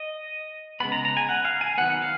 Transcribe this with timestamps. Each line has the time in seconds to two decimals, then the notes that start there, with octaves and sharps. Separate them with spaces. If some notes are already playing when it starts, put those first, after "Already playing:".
Already playing: D#5
0.80 C#3 G#3 B3 B5
0.92 A#5
1.05 A#5
1.17 G#5
1.29 F#5
1.45 F5
1.61 G#5
1.78 D#3 F#3 B3 F#5
2.02 F5